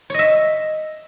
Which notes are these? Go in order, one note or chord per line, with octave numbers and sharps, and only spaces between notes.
C#5 D#5 E5